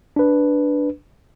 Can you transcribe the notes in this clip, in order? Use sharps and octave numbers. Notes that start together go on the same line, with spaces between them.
D4 B4